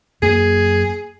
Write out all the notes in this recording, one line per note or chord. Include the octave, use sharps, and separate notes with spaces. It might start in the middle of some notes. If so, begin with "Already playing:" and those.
F#2 A#3 G#4